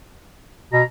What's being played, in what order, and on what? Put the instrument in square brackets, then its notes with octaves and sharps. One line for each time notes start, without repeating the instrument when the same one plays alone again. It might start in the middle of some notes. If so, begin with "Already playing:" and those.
[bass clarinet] B2 [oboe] A#5